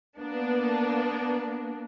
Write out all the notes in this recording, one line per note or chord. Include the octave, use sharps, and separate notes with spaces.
A#3 B3 D4